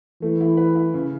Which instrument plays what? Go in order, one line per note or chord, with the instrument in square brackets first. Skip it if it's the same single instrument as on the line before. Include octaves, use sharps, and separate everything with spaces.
[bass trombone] E3 [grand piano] A3
[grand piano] E4
B4
E4
C#3